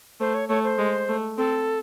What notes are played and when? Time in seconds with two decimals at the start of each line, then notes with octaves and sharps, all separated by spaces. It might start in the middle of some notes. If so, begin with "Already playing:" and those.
0.20 A3 C5
0.34 C#5
0.49 A3 C#5
0.64 C5
0.78 G#3
1.08 A3
1.38 C4 A4